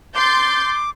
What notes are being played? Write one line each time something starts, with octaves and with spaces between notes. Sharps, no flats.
C6 D6 G6 A6